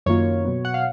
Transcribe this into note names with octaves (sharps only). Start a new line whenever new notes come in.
F#2 D#3 A#3 F4 C#5
B2 F#3 B3
F#5
F5